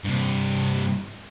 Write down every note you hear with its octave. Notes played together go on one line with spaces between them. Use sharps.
G2 C3